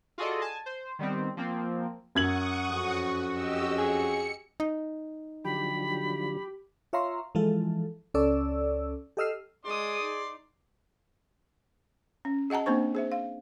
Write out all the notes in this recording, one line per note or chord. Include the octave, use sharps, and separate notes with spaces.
F4 F#4 G#4 A4 D5 D#5
G#5 A5
C5
D#3 G3 B3 C4
F3 A#3 C4
F#2 F#5 C#6 D#6 G#6 F#7
F2 C#4 F#4
G4 D#5 E6
G#4 C#7
D#4
D3 F3 F#3 G4 B5
F4 C#5 E5 F5 A#5 C6
E3 F3 G#3 F4 A4
C#2 C#4 A4 D5 E6
G4 A4 D#5 E6 F6 C7
G#3 G#4 D5 C6 D#6
D#4
C#4
G#4 D#5 F#5 A5 A#5
A#3 C4 D4 C5 C#6
G#4 C5 E5
F5